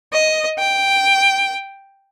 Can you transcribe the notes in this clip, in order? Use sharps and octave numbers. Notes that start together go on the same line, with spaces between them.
D#5
G5